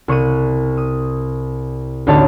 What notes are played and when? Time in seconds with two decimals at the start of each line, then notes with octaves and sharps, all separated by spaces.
0.08 C2 C#6 F#6 D#7
0.77 D#6
2.07 A1 D2 D#4 C#5 A5